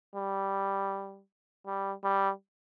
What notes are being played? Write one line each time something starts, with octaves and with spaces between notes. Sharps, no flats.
G3
G3
G3